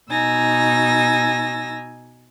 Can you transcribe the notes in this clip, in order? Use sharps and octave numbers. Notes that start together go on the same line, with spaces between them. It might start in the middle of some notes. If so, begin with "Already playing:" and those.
B2 D#4 G#5 E6 A#6